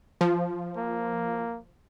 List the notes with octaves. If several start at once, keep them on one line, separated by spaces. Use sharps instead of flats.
F3
A#3